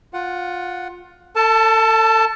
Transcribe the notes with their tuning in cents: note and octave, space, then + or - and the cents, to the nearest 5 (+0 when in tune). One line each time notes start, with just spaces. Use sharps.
F4 +20 F#5 +0
A4 +35 A5 +0